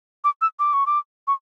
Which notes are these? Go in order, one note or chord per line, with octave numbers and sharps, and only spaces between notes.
D6
E6
D6
C#6
D6
C#6